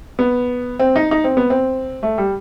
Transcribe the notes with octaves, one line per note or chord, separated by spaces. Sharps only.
B3
C4
D#4
D#4
C4
B3
C4
A3
G3